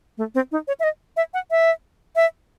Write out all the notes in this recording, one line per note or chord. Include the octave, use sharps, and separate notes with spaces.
A3
C4
D#4
C#5
E5
D#5
E5
F#5
E5
E5